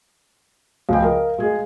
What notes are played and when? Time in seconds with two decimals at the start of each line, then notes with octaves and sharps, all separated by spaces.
0.89 C#2 F3 F5 G5
1.02 A#4 D#5
1.38 G#3 G#4